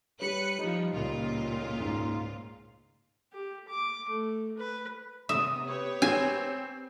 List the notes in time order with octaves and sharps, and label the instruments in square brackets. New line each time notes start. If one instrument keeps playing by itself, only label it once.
[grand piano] G3 C#5 [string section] B4 F#6 C#7
[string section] F3 [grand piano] G3 D#4
[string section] C#2 A#2 F4
[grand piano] G#2
[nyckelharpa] G4
D6
A3
B4
[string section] C3 B3 [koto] E5 [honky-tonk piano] D#6
[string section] G4 B4 C#5
[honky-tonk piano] C4 [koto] G#5